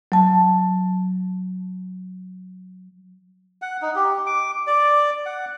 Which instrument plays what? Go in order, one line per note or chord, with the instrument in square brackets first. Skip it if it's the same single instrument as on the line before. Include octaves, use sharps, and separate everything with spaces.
[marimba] F#3 A5
[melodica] F#5
D#4
G4
D6
D5
F#5